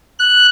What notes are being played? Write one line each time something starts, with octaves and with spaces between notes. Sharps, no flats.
F#6